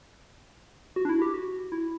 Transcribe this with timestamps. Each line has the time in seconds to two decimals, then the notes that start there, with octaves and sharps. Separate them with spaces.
0.96 F#4
1.05 D4
1.09 E4
1.22 G4
1.34 F#4
1.72 E4